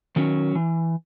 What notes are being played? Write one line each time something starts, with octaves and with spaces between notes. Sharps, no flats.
D#3 F#3 C#4
E3